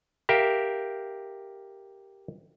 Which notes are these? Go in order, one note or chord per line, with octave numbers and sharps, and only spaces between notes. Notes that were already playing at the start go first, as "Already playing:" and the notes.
G4 A#4 E5 F5 G5